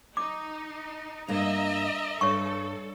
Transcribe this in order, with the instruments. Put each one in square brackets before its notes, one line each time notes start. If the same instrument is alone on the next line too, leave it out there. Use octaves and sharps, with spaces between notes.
[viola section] D#4 [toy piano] D6
[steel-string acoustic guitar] G2 A#3 [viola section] D#5 E5 A#5
[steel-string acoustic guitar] G2 [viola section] A4 [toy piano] C#5 C#6